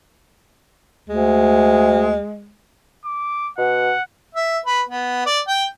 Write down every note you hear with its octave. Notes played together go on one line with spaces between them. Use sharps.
D2 G#3
D6
B2 F#5
E5
B4
B3
D5
G5